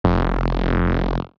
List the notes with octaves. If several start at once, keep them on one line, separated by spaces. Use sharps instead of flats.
F1